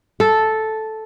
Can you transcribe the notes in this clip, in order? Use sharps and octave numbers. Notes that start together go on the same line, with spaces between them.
A4